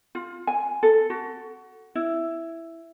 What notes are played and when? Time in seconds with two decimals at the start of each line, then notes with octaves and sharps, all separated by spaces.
0.15 F4
0.47 G#5
0.83 A4
1.10 F#4
1.95 E4